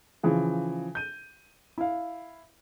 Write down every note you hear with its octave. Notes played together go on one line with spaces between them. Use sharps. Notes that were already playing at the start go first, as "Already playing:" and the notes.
C#3 E3 F3
G6 D#7
E4 F5